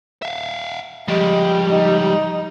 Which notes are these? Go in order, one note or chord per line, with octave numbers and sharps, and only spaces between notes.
E5 F5
F3 G3 G#3 D#5
D#4